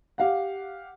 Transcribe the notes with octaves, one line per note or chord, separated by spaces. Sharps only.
G4 F5 F#5